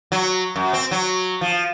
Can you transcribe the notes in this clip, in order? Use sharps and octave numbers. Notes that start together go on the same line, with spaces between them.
F#3
F#2
C4
F#3
F3